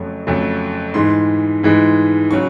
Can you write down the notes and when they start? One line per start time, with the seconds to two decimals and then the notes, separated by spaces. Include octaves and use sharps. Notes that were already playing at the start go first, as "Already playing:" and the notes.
Already playing: F2 C#3 F#3 A3
0.27 F2 C#3 F#3 A3
0.94 G#2 E3 G#3 C6
1.63 G#2 E3 G#3
2.31 C#3 F#3 C#6